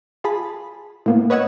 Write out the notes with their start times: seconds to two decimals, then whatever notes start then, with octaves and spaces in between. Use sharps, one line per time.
0.24 F4 G#4 A5 B5
1.06 A2 A#3 B3
1.30 B4 C#5 D#5 F#5 E6 G#6